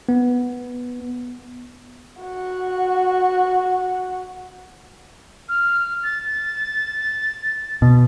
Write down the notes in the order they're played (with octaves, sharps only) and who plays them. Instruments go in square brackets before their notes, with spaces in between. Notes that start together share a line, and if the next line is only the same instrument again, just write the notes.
[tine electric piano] B3
[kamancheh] F#4 F#5
[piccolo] F6
A6
[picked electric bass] B2